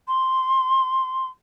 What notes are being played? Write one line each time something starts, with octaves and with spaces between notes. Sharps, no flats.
C6